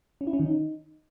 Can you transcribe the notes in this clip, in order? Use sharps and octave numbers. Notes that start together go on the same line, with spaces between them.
C#4
E4
C#4
D#3
D#4